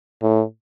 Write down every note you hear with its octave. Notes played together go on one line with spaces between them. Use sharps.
A2